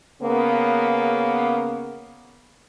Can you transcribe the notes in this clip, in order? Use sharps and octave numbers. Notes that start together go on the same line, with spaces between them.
C#3 A#3 B3